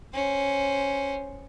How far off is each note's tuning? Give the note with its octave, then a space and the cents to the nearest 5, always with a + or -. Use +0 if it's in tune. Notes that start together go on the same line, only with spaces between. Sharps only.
C#4 +0 C5 +0